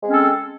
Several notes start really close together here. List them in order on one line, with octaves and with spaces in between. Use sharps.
G#3 C4 C#4 A4